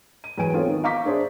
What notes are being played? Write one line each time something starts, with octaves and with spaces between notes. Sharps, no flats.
D#7
E2 F#3 G#5 D7 D#7
B3 C4 F4 A4 C#5
D#3 B3
F5 A#5 C#6 D6 G6 B6
D4 G#4 C5 D5 E5